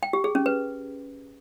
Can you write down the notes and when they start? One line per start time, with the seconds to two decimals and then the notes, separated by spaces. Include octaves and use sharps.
0.03 G5
0.13 G4
0.24 G#4
0.35 C#4
0.46 B4